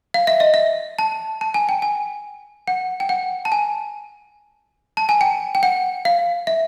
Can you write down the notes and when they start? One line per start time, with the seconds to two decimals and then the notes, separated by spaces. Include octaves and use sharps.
0.14 F5
0.27 E5
0.40 D#5
0.54 E5
0.99 A5
1.41 A5
1.54 G#5
1.69 G5
1.82 G#5
2.68 F#5
3.00 G5
3.09 F#5
3.45 A5
3.52 G#5
4.97 A5
5.09 G#5
5.21 G5
5.55 G5
5.63 F#5
6.05 F5
6.47 E5